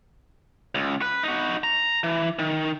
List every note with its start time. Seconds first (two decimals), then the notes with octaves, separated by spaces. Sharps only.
0.75 C#2
1.02 B4
1.23 D#4 F#4
1.64 A#5
2.04 E3
2.39 D#3